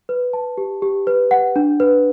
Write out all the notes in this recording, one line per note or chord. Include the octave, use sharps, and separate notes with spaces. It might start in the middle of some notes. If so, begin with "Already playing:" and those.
B4
A5
G4
G4
B4
F#5
D4
B4